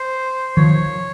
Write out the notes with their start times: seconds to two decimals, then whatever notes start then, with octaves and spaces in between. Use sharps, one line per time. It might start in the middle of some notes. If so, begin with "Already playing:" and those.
Already playing: C5
0.57 D#3 F3 C#5